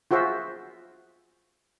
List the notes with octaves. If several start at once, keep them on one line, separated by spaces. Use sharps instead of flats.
F4 F#4 G#4 C5 E5